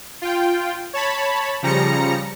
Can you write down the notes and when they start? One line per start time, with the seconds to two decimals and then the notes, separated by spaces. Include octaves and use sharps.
0.22 F4 G5
0.93 C#5 A5 B5
1.62 C#3 F3 G3 A#5 A#6 C#7